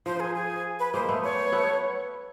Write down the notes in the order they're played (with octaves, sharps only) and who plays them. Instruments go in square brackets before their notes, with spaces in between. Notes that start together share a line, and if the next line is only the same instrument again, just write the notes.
[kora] F3 [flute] C5
[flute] G#4
G#4
B4
[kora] G#3 A#3 [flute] C5
[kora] A3 B3
[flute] C#5
[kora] A3 B3